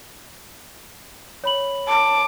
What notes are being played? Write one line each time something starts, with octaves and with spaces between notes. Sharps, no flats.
C#5 B5 F#7
A5 D6